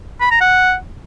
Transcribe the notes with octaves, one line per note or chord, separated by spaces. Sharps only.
B5
A#5
F#5